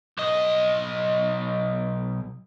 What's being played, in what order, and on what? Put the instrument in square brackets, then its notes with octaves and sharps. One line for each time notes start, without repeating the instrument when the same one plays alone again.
[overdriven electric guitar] B1 D#5